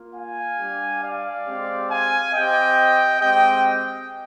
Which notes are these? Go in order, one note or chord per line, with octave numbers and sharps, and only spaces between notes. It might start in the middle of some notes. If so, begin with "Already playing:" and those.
Already playing: A#3 F4
F5 G#5
G3 D4 G4
D5 F5
G#3 C4 G4
F5 G#5
C4 G4 D#5 G5
G#3 C4 G4 D#5 G5